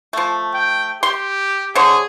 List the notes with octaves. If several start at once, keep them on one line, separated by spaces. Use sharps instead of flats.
F3 A3
G5
G4 C6
D3 G#4 C5 C#5